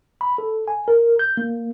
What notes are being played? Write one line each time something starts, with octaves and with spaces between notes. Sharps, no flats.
B5
A4
G#5
A#4
G6
A#3